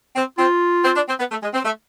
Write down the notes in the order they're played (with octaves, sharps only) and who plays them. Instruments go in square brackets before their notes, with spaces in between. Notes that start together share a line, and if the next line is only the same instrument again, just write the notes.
[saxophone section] C4
[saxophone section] C4 [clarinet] F4
[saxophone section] C4
D4
C4
B3
A3
G#3
C4
A3